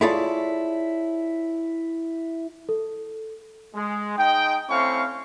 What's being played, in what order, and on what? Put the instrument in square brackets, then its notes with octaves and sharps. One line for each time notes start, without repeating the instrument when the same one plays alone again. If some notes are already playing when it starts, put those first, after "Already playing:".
[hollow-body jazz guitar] E4 F4 G#4 A4 C#5 D5
[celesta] A4
[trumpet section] G#3
G#3 D#4 D#5 G5
A3 C4 C#4 E4 F5 C#6